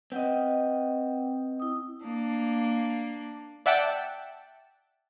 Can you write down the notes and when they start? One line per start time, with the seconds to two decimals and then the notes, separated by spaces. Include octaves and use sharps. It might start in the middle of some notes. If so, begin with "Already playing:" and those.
0.12 C4 B4 D#5 F#5 G5
1.60 E4 D#6
2.05 A#3 D4
3.66 D5 E5 F#5 G5 A5